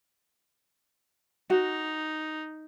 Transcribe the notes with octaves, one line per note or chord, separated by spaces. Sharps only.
D#4 F#4